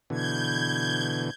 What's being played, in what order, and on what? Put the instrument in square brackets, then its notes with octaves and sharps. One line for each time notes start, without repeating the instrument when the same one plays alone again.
[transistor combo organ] B2 D3 E3 [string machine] G6 G#6